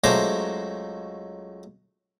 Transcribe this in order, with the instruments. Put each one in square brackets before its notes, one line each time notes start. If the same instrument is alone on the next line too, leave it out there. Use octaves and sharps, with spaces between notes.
[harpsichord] C#2 F#3 A3 C5 A#5 D6